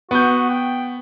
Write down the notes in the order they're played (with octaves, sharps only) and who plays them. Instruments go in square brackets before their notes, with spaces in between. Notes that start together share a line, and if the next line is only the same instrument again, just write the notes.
[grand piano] B3 G6 [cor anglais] F#4
[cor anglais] G5